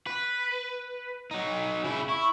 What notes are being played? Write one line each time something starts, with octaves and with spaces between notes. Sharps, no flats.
B4
F#3 D#4
C#3 E4
E4 C#6